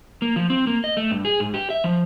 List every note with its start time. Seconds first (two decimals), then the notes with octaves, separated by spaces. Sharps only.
0.22 A#3
0.36 F3
0.50 C4
0.67 A#3
0.84 D#5
0.97 A3
1.11 G2
1.25 G#4
1.40 G#2
1.54 G4
1.70 E5
1.84 F3